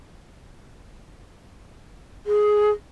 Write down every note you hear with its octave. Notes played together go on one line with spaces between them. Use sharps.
G#4